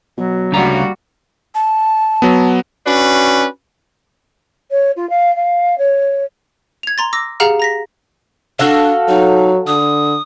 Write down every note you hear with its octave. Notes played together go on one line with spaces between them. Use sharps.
B2 F#3
D2 C#3 G3 A#3 F#4 A#5
A5
F#3 B3
C#4 D4 F#4 B4
C#5
F4
F5
F5
C#5
G#6 F7
A#5 C6 A6
D6 E6 A#6
G4 G#4 F5 F#5 A#5 F6
A#5 A#6 B6
D4 F#4 A4 F5
F#3 D#4
D3 D#6